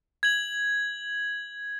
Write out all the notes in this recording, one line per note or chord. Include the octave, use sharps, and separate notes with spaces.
G#6 F#7